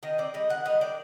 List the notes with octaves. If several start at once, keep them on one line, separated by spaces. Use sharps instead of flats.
D#3 D#5
C4 D5
G3 D#5
D#3 F#5
G3 D#5
D#3 D5